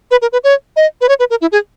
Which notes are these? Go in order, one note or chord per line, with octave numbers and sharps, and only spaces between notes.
B4
A#4
B4
C#5
D#5
B4
C#5
B4
A#4
E4
G#4